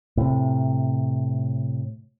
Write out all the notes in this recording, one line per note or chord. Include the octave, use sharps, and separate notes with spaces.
A2 C3